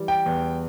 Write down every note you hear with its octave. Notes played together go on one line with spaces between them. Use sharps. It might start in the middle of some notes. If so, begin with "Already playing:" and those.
Already playing: E3 G3
G5
E2